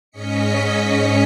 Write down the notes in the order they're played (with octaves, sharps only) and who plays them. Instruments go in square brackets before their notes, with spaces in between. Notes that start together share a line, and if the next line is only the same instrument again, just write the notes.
[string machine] G#2 C#4 D#5 B6 C#7